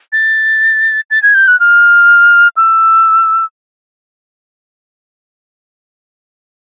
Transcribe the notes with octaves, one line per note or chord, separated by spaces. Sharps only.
A6
A6
G#6
G6
F#6
F6
E6